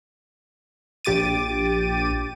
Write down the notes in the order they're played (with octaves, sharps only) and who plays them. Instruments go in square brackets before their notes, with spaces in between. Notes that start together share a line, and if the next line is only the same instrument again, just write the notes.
[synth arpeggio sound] A#1 G4 D6 A6 D#7